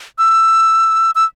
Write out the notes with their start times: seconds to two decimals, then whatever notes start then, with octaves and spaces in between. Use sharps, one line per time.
0.18 E6
1.15 E6